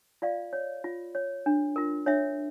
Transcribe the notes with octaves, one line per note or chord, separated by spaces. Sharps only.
F4 D5 F5
C#5
F4
C#5
D4
F4 A#4
D4 C#5 E5